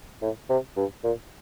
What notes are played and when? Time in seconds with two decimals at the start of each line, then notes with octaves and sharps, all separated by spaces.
0.22 A2
0.49 C3
0.76 G2
1.04 A#2